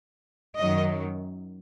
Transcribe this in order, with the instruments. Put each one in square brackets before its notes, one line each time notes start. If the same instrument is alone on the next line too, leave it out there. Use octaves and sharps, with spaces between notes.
[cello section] F#2 D#3 F#3 D#5